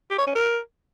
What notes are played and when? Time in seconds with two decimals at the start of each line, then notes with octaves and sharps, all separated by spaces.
0.10 G4
0.19 C#5
0.27 C#4
0.35 A#4